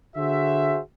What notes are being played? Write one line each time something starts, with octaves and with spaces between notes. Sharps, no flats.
D3 F#4 G#4 C5 E5